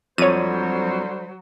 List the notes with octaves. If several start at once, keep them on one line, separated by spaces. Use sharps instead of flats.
F2 D3 F#3 G3 C5 C#5 D#7